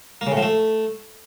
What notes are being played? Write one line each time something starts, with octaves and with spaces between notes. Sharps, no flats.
A#3
C#3
A2
F3
A3